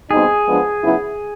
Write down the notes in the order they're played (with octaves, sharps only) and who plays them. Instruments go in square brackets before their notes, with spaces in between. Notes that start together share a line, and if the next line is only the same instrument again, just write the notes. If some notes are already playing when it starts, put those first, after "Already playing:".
[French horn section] B2 G3 C4 D#4 [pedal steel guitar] G#4
[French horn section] F3 G#3 B3 D4
C#3 F#3 B3 E4